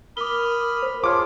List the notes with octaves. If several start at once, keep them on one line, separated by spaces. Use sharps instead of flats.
A#4 B5 D6 D#6 F6 G7
C5
F4 G#4 C#5 A5 C6 D6 F6